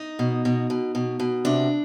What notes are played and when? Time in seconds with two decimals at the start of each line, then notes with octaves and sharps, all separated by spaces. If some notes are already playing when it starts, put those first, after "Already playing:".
Already playing: D#4
0.19 B2
0.45 B2
0.70 B2
0.95 B2
1.20 B2
1.45 C3 D4